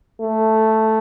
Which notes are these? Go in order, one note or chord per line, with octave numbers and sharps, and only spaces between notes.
A3